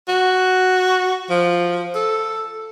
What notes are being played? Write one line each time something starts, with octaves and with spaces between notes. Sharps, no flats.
F#4
F3
A4